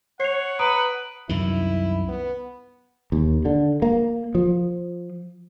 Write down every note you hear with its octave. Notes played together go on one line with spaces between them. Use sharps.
C#5 F#5 C7 F7
B4 A#5 D#6 D7
C2 F#2 D#3 E4
B3
D#2
D3
A#3
F3